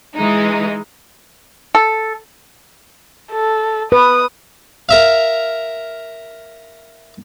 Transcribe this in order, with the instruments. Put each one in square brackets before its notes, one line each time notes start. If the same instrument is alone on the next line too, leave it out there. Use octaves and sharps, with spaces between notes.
[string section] E3 G#3 D#4
[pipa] A4
[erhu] A4
[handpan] B4 [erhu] D#6
[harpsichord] A#4 E5 F5